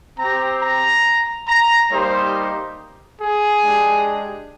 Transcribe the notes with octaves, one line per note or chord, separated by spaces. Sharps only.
C4 G4 A#5
A#5
A#5
G3 A#3 D#4 G4 C5
G#4
G#3 D4 G4